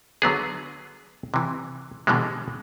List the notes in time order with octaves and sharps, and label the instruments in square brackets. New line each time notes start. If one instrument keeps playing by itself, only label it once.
[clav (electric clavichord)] D3 F#3 B3 G#4
C3 E3
B2 D3 E3 G3 G#3